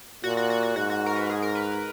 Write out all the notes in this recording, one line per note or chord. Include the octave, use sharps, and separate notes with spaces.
A#2 F#4
F#4
F#4
F#4
G#2 F#4
F#4
A#4
B4
G#4
A#4
B4